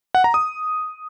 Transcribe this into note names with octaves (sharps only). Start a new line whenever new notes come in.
F#5
A#5
D#6